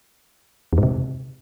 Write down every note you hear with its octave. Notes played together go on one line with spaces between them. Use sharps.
E2
G#2
C3